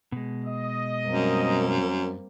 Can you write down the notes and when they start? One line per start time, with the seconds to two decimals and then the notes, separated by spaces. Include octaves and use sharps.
0.12 B2 G#3
0.44 D#5
1.06 F#2 G3 A#3 C4